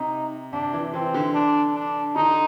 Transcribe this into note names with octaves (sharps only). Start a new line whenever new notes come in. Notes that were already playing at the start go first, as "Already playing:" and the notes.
Already playing: C3 D#4
C3 D4
E3
E3 C4
D3
D4
D4
D3 D#4